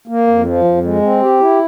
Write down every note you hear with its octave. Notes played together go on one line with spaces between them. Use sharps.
A#3
F2
F3
F2
G#3
C4
G4
E4